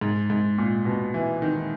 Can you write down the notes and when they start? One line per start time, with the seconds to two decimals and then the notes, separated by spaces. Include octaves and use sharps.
0.01 G#2
0.30 G#2
0.58 A#2
0.85 B2
1.14 E3
1.42 D#3